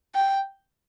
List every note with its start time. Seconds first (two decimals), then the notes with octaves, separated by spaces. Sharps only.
0.15 G5